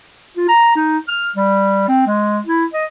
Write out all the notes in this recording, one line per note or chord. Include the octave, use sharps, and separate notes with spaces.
F4
A#5
D#4
F6
G3
C4
G#3
E4
D#5